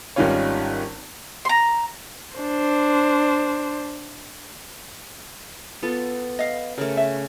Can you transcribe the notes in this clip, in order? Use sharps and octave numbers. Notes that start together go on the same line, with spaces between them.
G#1 D#3 G3 C#4 F4 C#5
A#5 C6
D4 C5
B3 F4 A4
D#5 F5
C#3 A3 A#4
E5